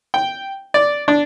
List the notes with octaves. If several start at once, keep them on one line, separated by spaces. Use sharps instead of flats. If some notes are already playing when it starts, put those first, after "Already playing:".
G5
D5
D4